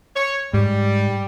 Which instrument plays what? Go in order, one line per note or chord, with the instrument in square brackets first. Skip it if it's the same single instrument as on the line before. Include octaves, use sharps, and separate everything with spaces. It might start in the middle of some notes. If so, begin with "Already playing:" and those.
[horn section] C#5
[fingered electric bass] G#2 [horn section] G3